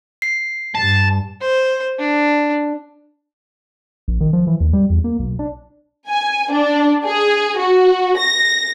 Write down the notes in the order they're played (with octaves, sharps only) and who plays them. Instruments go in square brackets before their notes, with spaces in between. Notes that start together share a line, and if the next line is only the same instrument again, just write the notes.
[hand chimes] C7
[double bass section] G2 [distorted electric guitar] A5
[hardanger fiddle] C5
D4
[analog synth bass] A#1
D#3
F3
E3
D#2
G3
E2
A#3
B1
D4
[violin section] G#5
D4
G#4
F#4
A#6